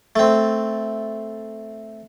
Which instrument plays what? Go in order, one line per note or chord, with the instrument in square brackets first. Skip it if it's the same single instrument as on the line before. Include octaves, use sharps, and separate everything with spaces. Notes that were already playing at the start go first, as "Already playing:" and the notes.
[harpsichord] A3 C4